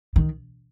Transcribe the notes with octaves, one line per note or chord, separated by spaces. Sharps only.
D#3